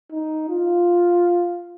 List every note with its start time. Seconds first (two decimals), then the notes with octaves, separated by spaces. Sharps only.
0.12 D#4
0.49 F4